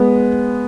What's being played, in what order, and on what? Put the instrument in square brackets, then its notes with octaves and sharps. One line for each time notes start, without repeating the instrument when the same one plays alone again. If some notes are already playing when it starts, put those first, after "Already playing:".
Already playing: [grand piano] G#3 B3